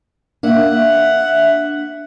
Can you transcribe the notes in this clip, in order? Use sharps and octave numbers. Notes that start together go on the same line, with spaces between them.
A#3 D4 E5 F#5